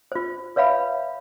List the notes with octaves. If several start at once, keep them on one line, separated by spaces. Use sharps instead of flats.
F4 C5
B4 C#5 E5 F5 B5